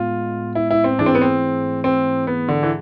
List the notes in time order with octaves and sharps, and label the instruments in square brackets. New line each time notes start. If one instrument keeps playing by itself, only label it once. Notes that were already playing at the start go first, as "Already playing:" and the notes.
Already playing: [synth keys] A2 G#3 B3 [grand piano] F4
[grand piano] E4
E4
C4
[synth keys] G#2 E3 A3 E4 G#4 [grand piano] D4
[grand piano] C4
B3
C4
C4
B3
D3
E3